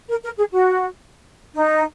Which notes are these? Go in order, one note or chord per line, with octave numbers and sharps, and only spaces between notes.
A#4
A#4
G#4
F#4
D#4